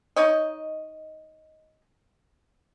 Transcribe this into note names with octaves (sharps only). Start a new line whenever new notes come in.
D#4 C#5 D#5